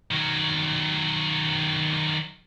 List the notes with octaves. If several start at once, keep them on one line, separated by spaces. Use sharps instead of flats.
D#3 F#3